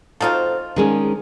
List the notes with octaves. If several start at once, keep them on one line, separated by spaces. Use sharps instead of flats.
F3 C4 D#4 F4 F#4 A4
D#3 G#3 C#4 D4 G#4